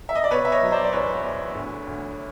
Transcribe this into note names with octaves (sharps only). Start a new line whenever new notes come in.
E5
D#5
D5
B2 B4 C#5
E5
C#5 D#5
F#3
C5 D5
D5
E2 B4 C#5
E2
D2
D2